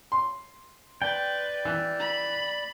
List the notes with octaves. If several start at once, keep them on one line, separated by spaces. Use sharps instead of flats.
C6
B4 D5 G5
E3
B5